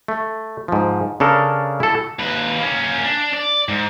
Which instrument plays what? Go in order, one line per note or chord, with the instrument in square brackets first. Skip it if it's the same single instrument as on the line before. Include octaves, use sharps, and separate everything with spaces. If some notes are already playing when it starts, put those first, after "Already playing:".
[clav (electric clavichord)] A3
G#2 F3
C#3 D4 A4 A#4
E4 A4
[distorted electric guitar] D#2 B4
A#3 C#4
D4
D5
G#2